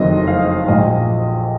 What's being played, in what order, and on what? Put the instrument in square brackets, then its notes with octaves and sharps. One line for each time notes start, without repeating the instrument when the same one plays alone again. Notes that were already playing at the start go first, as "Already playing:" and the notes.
Already playing: [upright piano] F#1 F2 D#3 F#3 D#5
F5
A#1 A#2 F#3 D#5